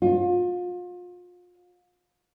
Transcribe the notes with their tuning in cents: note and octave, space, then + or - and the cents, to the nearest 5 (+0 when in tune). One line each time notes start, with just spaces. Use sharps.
F4 +35